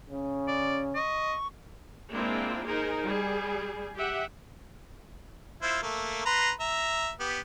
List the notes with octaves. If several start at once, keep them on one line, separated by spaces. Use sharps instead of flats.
C#3 C#4
D5
D#5 C#6
G#3 A#3 C4 D4 E4 F4
D#4 G#4 A#4 C5
G3 G#4
G4 E5 F#5
E4 F4 C5
A3 A#3
B4 A#5 C6
E5 A#5
B3 G4